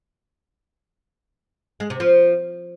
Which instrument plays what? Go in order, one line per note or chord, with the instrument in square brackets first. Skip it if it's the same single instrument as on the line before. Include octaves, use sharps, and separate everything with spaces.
[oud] G#3
C3
F3